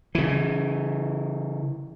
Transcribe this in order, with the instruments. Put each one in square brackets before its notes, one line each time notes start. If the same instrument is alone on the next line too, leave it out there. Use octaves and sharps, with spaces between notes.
[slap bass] C#3 E3